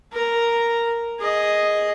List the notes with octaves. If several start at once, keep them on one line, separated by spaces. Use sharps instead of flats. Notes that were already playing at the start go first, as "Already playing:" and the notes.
A#4 A#5
G#4 D#5